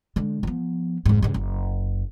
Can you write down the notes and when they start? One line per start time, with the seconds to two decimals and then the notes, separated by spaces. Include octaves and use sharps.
0.16 D3 G#3
0.43 F3 B3
1.06 F1 G#2
1.22 G2 C#3
1.34 F#1